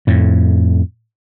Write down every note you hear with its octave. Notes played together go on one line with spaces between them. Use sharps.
F2 A2